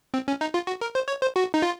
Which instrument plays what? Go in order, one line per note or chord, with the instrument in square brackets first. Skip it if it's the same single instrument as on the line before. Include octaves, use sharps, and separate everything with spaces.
[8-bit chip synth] C4
C#4
D#4
F4
F#4
A#4
C5
C#5
C5
F#4
D#4
F4